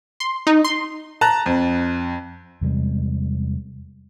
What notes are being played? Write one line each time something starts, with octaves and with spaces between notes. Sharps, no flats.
C6
D#4
C6
A5 A#5 F#6
F2
E2 C3 G3 G#3